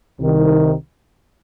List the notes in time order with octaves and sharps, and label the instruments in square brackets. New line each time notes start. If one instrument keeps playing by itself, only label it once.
[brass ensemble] C2 C3 D#3